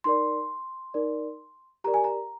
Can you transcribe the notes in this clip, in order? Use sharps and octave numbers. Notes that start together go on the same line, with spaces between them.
D#4 A#4 D5 C6
D#4 A#4 D5
G4 A#4 D5 A#5
G#5
A#5